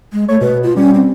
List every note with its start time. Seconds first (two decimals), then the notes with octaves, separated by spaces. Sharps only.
0.13 G#3
0.28 A3 C#5
0.41 B2 B4
0.63 F4
0.77 G3 C#4
0.94 C4